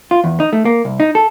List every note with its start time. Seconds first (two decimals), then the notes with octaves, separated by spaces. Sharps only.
0.11 F4
0.24 E2
0.40 D#4
0.53 A3
0.65 A#3
0.85 C2
1.00 D#4
1.15 A4